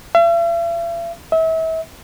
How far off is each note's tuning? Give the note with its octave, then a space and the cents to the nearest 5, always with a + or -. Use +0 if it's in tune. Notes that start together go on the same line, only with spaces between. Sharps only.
E5 +45
E5 -35